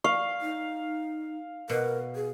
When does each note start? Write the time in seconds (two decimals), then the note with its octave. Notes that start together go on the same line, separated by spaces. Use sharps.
0.04 F5 C#6
0.41 D#4
1.69 B2 A#4
2.15 G#4